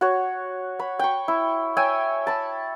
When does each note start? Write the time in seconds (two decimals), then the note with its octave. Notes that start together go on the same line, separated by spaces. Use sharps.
0.01 F#4 C#5
0.79 C#5 B5
0.99 G5 C#6
1.28 E4
1.77 C#5 E5 G5 G#5
2.27 A5 B5